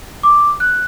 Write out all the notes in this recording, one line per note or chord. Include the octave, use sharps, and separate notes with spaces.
D6
F#6